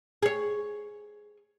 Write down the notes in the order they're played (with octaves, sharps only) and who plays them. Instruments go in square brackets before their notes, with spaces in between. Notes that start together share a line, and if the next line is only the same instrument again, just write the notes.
[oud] G#4 C#5